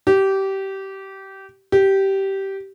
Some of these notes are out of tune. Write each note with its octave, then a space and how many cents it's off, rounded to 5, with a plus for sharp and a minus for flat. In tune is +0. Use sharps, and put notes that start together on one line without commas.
G4 -20
G4 -15